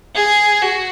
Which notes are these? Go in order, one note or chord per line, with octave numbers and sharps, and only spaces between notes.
G#4
F#4